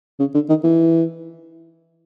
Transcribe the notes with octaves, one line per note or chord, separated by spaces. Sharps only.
C#3
D3
D#3
E3